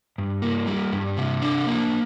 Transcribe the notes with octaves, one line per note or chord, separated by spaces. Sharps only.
G2
A#3
G3
G2
C3
D4
A#3